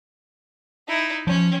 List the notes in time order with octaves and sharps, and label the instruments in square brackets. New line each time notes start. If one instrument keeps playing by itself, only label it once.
[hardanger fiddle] D#4 E4
[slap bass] F3 [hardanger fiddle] C#4